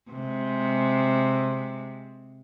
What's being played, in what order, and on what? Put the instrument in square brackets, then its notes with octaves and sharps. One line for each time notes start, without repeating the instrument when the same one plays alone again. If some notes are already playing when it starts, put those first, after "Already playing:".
[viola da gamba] C3 G#3